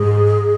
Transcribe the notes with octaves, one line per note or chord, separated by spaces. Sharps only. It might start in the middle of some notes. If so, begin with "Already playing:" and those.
Already playing: G#2 G#4